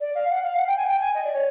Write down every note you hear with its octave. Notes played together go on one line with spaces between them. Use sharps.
D5
F5
F#5
F5
F#5
G5
G#5
G5
G#5
D#5
D5
C#5